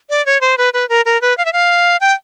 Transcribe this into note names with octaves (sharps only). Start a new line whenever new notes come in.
D5
C#5
C5
B4
B4
A#4
A#4
B4
F5
E5
F5
G5